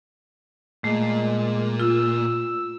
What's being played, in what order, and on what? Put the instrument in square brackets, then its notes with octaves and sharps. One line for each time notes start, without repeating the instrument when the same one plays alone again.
[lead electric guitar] A#2 [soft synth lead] G#3 [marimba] A3
[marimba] F4 [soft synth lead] E6